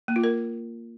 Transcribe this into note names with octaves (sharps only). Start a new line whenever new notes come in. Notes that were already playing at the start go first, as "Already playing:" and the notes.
A#3
F4
A#4